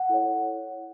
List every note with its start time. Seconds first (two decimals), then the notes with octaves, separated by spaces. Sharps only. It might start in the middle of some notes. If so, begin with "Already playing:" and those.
Already playing: F#5
0.09 E4 A4 C#5